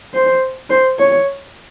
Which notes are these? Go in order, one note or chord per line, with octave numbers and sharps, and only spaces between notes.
C5
C5
C#5